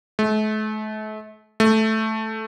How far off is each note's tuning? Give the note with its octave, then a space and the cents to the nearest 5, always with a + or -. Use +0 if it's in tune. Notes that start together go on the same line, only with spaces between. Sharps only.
A3 -40
A3 -5